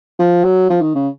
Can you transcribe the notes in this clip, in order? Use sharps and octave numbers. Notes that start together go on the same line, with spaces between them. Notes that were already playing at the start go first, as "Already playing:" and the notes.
F3
F#3
F3
D#3
C#3